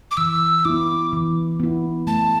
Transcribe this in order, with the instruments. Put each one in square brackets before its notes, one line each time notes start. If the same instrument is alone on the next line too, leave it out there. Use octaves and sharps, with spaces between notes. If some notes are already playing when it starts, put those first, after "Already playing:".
[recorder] D6
[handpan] E3 [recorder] E6
[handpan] B3 E4 [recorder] D6
[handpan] E3
B3 E4
[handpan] A3 [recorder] A5